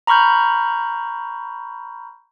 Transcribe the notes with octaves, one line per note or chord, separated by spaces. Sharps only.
A#5 B5 C#6 F6 G6